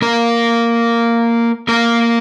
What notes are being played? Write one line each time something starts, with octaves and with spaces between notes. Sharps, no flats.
A#3 A#4
A#3 A#4